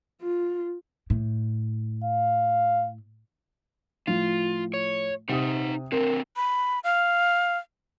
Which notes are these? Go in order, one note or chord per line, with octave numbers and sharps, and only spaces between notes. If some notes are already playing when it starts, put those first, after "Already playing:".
F4
A2
F5
A2 F3 F4
C#5
C3 D#4 F#5 D#6
D3 C4 A#4
B5
F5